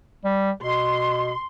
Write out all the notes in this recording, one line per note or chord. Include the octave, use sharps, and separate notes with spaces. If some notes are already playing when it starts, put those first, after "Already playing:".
G3
B2 C6